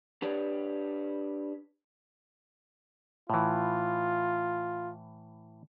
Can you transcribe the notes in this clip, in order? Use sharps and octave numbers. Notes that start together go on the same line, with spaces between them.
D4 G4 B4 C#5 D5
A2 E3 F4